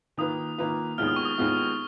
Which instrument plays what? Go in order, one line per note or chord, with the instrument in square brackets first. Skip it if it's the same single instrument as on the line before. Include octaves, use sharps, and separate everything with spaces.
[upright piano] D#3 A#3 F4 B4 [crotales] D#6
[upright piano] D#3 A#3 F4 B4
[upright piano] D#2 D#3 G#3 B3 F4 [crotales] F6
[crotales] D#6
C#6
D#6
[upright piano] D#2 D#3 G#3 B3 F4